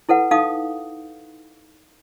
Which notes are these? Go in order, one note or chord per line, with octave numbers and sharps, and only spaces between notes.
E4 A4 B4 F#5
D#4 A4 F5 D6 D#6